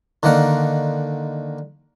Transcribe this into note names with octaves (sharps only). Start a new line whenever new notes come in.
D3 D#3 A#3 F#5